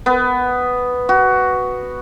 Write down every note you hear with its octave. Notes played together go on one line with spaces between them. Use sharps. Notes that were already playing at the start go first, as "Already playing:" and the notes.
B3
F#4